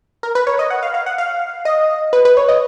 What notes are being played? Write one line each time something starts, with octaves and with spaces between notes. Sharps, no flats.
A#4
B4
C#5
D#5
F#5
F5
F5
F#5
F5
D#5
B4
B4
C#5
D#5